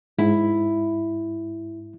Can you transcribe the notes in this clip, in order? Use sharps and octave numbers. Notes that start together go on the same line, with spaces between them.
G#2 E4